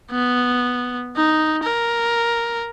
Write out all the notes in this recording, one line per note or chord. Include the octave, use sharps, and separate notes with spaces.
B3
D#4
A#4